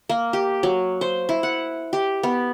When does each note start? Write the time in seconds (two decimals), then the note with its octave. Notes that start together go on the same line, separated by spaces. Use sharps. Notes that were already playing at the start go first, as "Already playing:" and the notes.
0.09 A#3
0.33 G4
0.63 F#3
1.01 C5
1.29 E4
1.43 F#5
1.93 G4
2.23 B3